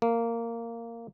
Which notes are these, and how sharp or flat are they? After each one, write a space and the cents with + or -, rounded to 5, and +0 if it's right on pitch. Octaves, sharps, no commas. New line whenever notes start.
A#3 -10